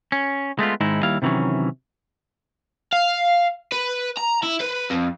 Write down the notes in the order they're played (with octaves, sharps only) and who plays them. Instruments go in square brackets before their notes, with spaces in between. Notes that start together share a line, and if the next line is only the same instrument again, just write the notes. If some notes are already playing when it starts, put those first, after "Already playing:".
[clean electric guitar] C#4
G#3 A3 B3 F4
G#2 D#3 G#3 D#4 E4
D#2 G3 E4 F5
C3 D#3 E3 F#3 C#4
[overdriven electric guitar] F5
B4
A#5
E4
B4
F2